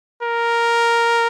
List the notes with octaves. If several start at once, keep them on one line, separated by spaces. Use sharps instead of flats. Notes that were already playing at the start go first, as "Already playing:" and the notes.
A#4